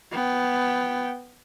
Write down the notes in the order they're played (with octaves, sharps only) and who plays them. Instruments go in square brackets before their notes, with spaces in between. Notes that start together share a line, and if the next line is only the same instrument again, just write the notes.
[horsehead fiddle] B3 G5